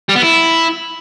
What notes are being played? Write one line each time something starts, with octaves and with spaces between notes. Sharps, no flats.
G3
B3
E4